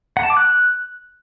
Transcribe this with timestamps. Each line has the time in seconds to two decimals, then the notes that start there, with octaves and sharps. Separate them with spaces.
0.17 F#5
0.23 A5
0.30 D6
0.37 F#6